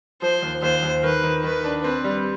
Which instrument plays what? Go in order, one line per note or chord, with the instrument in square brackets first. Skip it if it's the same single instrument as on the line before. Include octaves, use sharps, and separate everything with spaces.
[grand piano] F3 [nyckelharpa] C5
[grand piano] D#2
[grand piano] D#2 [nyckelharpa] C5
[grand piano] D#2
[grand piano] D#3 [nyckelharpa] B4
[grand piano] D#3
[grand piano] D#3 [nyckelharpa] B4
[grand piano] D4
[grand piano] C4 [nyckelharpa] B4
[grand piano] G3